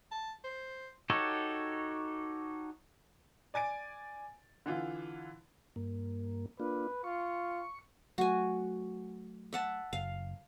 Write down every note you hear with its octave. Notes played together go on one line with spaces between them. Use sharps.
A5
C5
D#4 F#4 G4 A4 C#5
D5 G#5 A6 D7
D3 E3 F4
G2 A#3
A#3 D4 F4 B4
F4 C#6
F#3 A3 F#4 G#5
E5 F#5 A5
F#1 F5